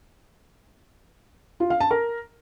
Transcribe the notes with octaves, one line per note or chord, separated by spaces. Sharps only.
F4
F5
A5
A#4